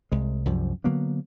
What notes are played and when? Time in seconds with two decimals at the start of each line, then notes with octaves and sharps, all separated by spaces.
0.12 C2 G#3
0.45 C2 F#2 F3 G3
0.84 D3 F#3 A#3 B3